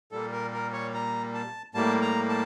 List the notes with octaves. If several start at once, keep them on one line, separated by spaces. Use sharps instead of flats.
A#2 G3 A#3 A4
A#4
A#4
C#5
A#5
A5
A2 G3 A#3 A5
A#5
A5